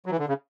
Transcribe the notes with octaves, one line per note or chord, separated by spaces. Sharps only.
F#3
E3
D3
C#3